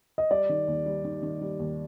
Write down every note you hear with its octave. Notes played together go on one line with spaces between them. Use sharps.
D#5
G3 D5
D#3
D#2
G3
D#3
D#3
G3
D#2